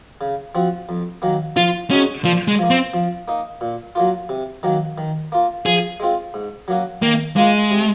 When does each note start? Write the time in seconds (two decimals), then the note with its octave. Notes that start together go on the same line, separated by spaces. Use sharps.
0.21 C#3
0.55 F3 C4 F#4
0.89 F2
1.22 D#3 F#3 A#3
1.56 F3 F4
1.91 G#3 C#4 D#4 F#4
2.24 A#2 F3
2.48 G#3
2.59 F3 A#3
2.70 C4
2.94 F3
3.28 A#3 D#4
3.61 A#2
3.95 F#3 A#3 F4
4.29 C3
4.63 D#3 F#3 A#3
4.98 D#3
5.32 A#3 F4
5.66 F3 G#4
6.00 G#3 C4 F4
6.34 G#2
6.68 F#3 A#3 C#4 F#4
7.02 D#3 A#3
7.36 G#3 A#3 F4
7.71 C3